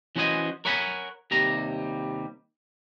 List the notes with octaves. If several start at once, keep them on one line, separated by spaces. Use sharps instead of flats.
E3 C#4 F#4 C5 D#5 G#5
A#4 C#5 F#5 G#5 B5
D#2 C3 G3 A#5